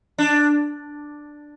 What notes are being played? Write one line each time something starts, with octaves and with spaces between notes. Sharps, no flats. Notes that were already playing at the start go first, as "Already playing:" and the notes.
D4